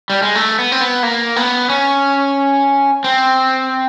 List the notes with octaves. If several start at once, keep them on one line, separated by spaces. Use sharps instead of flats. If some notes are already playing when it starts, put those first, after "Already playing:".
G3
G#3
A3
B3
C4
B3
A#3
B3
C#4
C4